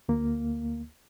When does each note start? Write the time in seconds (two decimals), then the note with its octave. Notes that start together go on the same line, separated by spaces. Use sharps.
0.09 D2 A#3